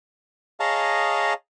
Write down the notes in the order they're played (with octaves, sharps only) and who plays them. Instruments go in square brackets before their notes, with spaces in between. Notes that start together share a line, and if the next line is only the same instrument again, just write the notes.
[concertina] G#4 C#5 D#5 F5 A5 A#5